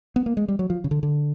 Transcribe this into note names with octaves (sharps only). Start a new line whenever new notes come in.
B3
A#3
G#3
G3
F#3
F3
C#3
D3
D3